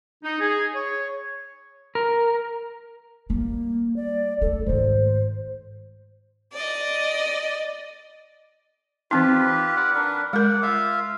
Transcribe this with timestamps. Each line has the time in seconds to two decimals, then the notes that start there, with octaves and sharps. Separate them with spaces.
0.23 D#4
0.40 G#4
0.74 C#5
1.95 A#4
3.30 G3 A#3
3.96 D5
4.41 C#2 A3 A4
4.66 G#2 D#3 C5
6.53 D5 D#5
9.11 E3 C4 D#4 F4 G4 B4
9.77 B4 D5 F#5
9.95 D4 A#4 B4
10.33 G#3 A#4 D5 F#5
10.63 F4 E5 F5